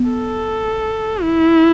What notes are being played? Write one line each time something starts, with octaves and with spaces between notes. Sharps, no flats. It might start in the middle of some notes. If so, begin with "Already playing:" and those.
Already playing: B3
A4
E4